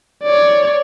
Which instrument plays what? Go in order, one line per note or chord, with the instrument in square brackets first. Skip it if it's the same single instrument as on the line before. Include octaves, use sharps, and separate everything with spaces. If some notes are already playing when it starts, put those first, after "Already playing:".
[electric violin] C#5 D5